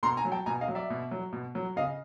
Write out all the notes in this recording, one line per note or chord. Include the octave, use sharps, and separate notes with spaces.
B2 A#5 C6
G#5 A#5
F#3
G5 A5
B2 G#5 A#5
D#5 F5
F#3
D5 E5
B2
F#3
B2
F#3
C#3 D#5 F5